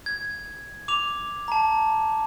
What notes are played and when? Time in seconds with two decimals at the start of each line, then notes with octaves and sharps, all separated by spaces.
0.06 G#6
0.88 D6 F7
1.48 A5 A#5